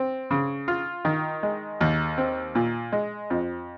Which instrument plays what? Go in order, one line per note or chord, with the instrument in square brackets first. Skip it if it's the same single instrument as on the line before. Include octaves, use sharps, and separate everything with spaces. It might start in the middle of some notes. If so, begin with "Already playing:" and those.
Already playing: [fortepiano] C4
C#3
F4
D#3
G#3
D#2
C4
A#2
G#3
F2